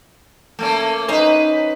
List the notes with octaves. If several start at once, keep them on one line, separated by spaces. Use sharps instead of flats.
A3 A#3 C#4
C#4 D#4 B4 C5